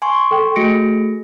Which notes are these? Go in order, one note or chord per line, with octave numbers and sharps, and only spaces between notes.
G#5 C6 C#6
A4 G5
A3 F#4 G#4 A#6 C#7 D7